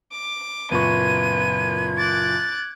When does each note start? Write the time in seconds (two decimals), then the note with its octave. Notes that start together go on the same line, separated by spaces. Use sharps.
0.12 D6
0.71 F#1 A#2 B3 C#6 G#6 D#7
1.98 D6 F#6 A6